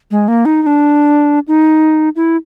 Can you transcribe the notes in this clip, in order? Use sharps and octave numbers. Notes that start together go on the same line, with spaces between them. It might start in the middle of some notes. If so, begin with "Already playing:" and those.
G#3
A#3
D#4
D#4
D4
D#4
E4